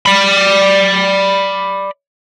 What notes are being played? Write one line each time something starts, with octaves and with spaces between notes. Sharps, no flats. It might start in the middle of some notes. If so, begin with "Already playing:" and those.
D5 B5